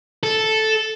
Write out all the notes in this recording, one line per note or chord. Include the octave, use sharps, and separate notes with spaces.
A4